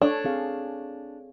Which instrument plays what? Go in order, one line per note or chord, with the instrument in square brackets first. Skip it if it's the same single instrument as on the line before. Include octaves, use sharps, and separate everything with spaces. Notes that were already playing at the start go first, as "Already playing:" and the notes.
[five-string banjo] D4 [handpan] A4 C#5
[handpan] C4 G#4 F5